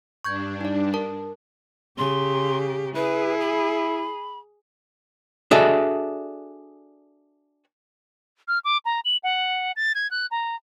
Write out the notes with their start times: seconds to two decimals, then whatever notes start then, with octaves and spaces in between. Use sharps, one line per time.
0.24 G2 D4 C#6 G6 G#6
0.61 D#4 D5
0.94 A#4 A5
1.98 C#3 G4 C6
2.95 E4 G#4 B4
3.40 B5
5.51 D4 F#4 G#4 A4 D#5 E5
8.48 F6
8.65 D6
8.85 A#5
9.05 F#7
9.24 F#5
9.76 A6
9.95 G#6
10.11 F#6
10.31 A#5